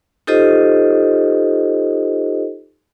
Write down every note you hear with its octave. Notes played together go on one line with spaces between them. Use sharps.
D#4 F4 G4 A4 C5 D#5